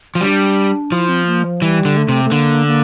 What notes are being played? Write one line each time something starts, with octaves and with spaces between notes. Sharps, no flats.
F3
G3 D4
F3 E4
C4
A#3
F3
E3 G3
D3
A3
C3
A3
D3 A#3
A#3